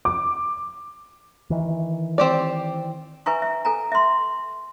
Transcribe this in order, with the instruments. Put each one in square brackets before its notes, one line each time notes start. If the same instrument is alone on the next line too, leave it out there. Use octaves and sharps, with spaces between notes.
[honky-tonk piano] D6
[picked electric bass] D#3 E3
[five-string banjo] C4 G4 D5
[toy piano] B4 E5 G#5 A#5 C#6
E5
A4 G#5 A#5
E5 C6